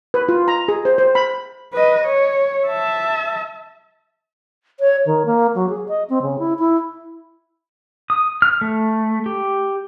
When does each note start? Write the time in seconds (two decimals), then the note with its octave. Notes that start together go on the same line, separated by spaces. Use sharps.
0.14 B4
0.29 F4
0.48 A#5
0.68 G#4
0.85 C5
0.98 C5
1.15 B5
1.73 B4 D#5
2.05 C#5
2.67 E5 A5
4.80 C#5
5.06 D#3
5.26 A#3
5.55 F#3
5.69 G#4
5.88 D#5
6.10 C4
6.22 C#3
6.39 E4
6.59 E4
8.10 D#6
8.42 F6
8.61 A3
9.26 G4